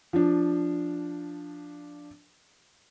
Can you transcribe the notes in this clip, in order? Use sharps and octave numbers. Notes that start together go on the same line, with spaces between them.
F3 D4